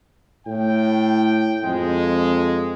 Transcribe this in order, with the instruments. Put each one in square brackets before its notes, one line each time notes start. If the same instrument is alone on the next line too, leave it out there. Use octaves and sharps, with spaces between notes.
[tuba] A2 [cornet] G5
[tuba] F2 [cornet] G#3